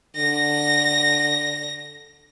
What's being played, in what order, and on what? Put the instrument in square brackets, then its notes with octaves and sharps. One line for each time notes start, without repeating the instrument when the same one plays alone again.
[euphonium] D3 [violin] A#6